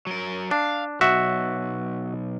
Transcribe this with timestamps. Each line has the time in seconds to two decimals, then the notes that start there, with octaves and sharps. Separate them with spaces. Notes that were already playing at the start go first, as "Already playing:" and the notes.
0.07 F#3 A#4
0.51 D4 F5
1.01 B1 F#4 E5